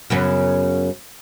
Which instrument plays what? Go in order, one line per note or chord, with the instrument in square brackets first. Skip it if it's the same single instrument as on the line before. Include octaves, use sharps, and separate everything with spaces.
[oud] F#2 C#3 B3